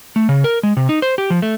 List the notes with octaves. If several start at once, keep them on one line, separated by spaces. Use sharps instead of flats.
A3
C#3
A#4
G#3
C3
D#4
C5
G4
F3
A3